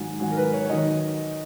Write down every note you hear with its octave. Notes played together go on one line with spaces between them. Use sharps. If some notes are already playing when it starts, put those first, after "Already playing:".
Already playing: G#2 D#3 F#3
G#2 D#3 F#3
A#4
B4
C#5
C#5
D#3 F#3 D#5